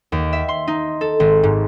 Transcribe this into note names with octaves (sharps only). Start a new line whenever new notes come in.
D#2
E5
C6
D#4
A4
G#1
G#2